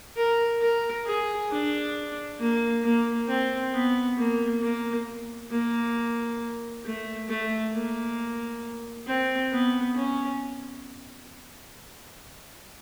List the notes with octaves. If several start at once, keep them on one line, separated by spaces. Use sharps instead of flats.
A#4
A#4
G#4
D4
A#3
A#3
C4
B3
A#3
A#3
A#3
A3
A3
A#3
C4
B3
C#4